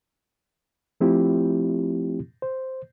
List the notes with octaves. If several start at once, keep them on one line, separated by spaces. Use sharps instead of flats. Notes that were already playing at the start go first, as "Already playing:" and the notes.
F3 A3 C4 E4 F4 G4
C5